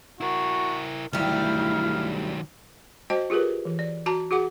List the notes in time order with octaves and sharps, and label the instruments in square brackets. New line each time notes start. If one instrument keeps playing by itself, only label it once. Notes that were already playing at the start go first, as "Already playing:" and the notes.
[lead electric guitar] E4 A#4 [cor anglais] F#4
[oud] D2 G3 [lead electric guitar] D#3 F#3 [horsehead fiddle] E4 [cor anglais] F5
[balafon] F#4 C5 D#5 G5 A5
F4 G4 G#4 A#4 B4
E3
D5
F#4 A5 A#5
F#4 G#4 F#5 D6